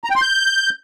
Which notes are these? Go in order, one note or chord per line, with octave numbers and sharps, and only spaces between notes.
A#5
G5
C6
G6